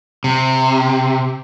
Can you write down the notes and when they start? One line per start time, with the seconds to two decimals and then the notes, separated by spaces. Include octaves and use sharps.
0.24 C3